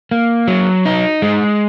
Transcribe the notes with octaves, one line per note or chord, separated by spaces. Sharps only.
A#3
F#3
D#4
G#3